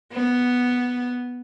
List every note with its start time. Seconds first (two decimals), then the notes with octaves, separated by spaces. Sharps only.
0.12 B3